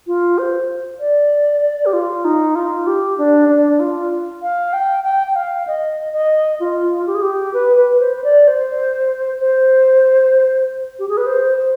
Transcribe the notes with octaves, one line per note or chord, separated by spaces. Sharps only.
F4
C5
D5
G4
F4
D#4
F4
G4
D4
D4
F4
F5
G5
G5
G5
F5
D#5
D#5
F4
G4
G#4
G4
B4
B4
C5
C5
D5
C5
C5
G4
G#4
B4
C5
C5